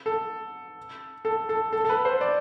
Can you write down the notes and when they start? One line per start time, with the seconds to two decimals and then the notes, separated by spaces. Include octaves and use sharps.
0.06 A4
1.25 A4
1.49 A4
1.73 A4
1.85 A4
1.89 B4
2.05 C5
2.21 D5